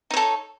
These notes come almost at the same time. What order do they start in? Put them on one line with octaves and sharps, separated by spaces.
D#4 C#5 A4